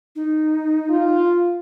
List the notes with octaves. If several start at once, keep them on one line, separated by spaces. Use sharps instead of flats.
D#4
F4